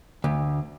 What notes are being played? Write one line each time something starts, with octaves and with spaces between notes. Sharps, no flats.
D2